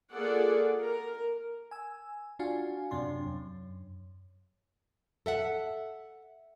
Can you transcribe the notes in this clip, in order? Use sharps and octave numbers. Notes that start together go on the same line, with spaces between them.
A#3 F4 G#4 A4 D5 F#5
A#4
G#5 E6
D4 F4 F#4 F5 G#5
F#2 C3 D4 C6
F#2
A4 E5 F#5